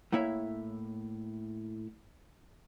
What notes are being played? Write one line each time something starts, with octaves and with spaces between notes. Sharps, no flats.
A2 A#3 E4 C#5 E5